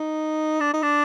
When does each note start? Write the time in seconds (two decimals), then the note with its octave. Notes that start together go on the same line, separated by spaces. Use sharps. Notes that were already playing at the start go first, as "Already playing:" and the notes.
Already playing: D#4
0.60 D4
0.73 D#4
0.83 D4